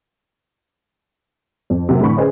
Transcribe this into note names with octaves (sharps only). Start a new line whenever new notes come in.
F2
C3 F#3 A#3
A2 D3 E3 B5 C#6
C#4 G#4 B4 C5 D#5